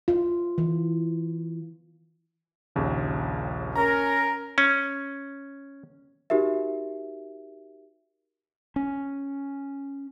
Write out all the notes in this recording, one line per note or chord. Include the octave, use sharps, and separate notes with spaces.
F4
E3
A#1 D#2 C#3
C#4 A#4 A#5
C#4
D#4 F#4 G4 A#4 E5
C#4